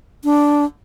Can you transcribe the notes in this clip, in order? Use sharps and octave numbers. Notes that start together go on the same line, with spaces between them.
D4